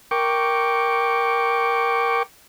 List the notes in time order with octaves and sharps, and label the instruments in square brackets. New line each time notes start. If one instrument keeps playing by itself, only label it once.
[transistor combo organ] A#4 G5 C#6 D6